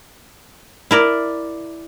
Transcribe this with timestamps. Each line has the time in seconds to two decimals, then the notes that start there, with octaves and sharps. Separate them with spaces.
0.91 E4 A#4 D5